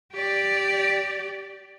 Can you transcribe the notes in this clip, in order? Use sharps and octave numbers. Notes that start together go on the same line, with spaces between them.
G4 D5